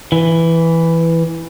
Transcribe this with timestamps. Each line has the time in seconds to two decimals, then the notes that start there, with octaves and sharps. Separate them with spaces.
0.12 E3